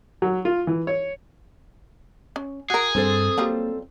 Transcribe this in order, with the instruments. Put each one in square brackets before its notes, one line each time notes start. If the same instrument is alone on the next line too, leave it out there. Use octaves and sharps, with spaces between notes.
[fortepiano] F#3
F4
E3
C#5
[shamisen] C#4
[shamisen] F#4 A#4 [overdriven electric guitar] G#4
[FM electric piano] G2 A6 [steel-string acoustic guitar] C4 A4 C5
[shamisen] F#3 G3 F4 [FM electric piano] A#3